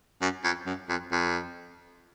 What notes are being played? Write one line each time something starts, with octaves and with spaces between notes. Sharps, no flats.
F#2
F2
F#2
F2
F2